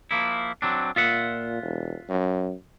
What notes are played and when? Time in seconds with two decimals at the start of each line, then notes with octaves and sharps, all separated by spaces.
0.11 F3 A#3 E4
0.62 F#3 C4 D4
0.96 A#2 F4 E5 F#5
1.63 E1
2.09 F#2